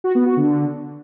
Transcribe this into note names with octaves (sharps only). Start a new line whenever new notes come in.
F#4
B3
F#4
D3